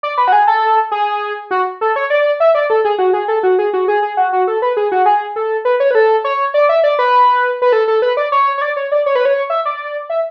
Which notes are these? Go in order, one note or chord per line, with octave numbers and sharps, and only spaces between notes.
D5
B4
F#4
G#4
A4
G#4
F#4
A4
C#5
D5
E5
D5
A4
G#4
F#4
G#4
A4
F#4
G#4
F#4
G#4
G#4
F#4
F#4
A4
B4
G#4
F#4
G#4
A4
B4
C#5
B4
A4
C#5
D5
E5
D5
B4
B4
A4
A4
B4
D5
C#5
C#5
D5
C#5
D5
C#5
B4
C#5
E5
D5
E5